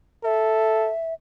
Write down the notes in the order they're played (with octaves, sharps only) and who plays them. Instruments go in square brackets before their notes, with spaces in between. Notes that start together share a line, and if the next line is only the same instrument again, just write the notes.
[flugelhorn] A4 [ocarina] E5